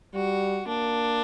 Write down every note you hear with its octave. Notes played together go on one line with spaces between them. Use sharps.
G3 F#4
A#3 D4